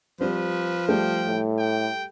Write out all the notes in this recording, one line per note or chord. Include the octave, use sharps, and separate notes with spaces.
F3 G3 C4 B4
G3 A3 G5
A2
G5